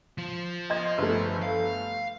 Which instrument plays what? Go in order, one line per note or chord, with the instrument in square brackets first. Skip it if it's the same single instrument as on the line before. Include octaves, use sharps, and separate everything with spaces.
[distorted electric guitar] F3
[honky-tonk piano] D#5 C6 G#6
G1 A3
[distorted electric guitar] F5